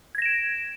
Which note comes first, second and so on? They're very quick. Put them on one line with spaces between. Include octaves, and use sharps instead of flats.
G#6 A#6 E7 D7